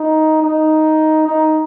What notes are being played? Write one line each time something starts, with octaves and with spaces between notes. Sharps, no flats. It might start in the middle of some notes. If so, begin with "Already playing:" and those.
Already playing: D#4
D#4
D#4